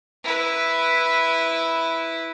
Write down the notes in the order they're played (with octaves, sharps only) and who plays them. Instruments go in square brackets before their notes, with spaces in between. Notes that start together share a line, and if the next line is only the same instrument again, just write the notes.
[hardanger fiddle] E4 B4